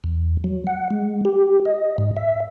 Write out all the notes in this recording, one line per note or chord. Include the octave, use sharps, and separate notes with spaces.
E2
F#3
F#5
G#3
G4
D#5
G#2
E5